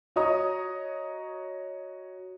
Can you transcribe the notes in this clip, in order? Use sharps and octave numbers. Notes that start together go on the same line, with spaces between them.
F#4 C#5 D#5 A#5 D#6